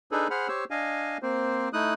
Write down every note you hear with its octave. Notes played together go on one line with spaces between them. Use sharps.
D4 D#4 G#4 A4 B4
G#4 C5 F#5 B5 F6
G4 C5 C#5 E6
D4 D#5 F5 G#5
A#3 C4 C5
A3 D#4 E4 D#6 F#6